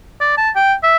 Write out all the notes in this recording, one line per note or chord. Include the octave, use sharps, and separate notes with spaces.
D5
A5
G5
E5